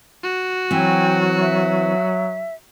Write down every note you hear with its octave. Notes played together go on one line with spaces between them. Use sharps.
F#4
E3 F#3 C4 G5 G#5
E5